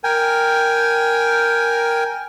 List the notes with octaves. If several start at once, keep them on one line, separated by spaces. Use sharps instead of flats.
A#4 G5 G#5